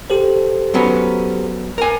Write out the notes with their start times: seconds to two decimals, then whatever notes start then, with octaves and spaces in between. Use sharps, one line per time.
0.10 G4 A4 C5
0.74 F#3 B3 C#4
1.78 A#4 G#5